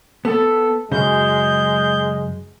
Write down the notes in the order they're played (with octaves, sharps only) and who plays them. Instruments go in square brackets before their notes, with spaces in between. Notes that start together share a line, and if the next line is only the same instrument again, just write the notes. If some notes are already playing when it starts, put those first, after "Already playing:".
[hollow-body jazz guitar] B3 [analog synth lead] A4
[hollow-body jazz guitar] F#2 C#3 [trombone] G#3 [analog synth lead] G6